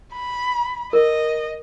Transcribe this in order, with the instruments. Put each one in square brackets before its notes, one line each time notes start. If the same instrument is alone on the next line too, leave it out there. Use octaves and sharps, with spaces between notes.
[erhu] B5
[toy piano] A#4 [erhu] D#5